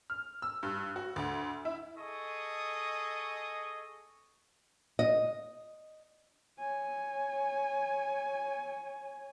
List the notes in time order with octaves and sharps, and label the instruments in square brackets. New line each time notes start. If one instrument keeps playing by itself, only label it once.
[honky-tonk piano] F6
E6
G2
F#4
D2
E4
[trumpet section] G#4 A4 D#5 C#6 D#6
[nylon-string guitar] D#5
[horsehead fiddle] C#5 G#5